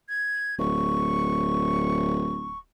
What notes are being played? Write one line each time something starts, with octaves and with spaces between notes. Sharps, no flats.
G#6
D1 C#6